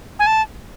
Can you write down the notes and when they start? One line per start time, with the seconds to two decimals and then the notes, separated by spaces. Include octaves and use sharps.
0.19 G#5
0.27 A5